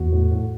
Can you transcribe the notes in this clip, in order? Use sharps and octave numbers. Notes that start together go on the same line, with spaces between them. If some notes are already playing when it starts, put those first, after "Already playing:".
Already playing: E2 F#4
A2
A2